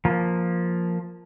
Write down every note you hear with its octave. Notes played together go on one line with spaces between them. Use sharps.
F3 A#3